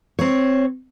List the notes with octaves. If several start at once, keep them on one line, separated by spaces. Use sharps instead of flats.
C4 C#5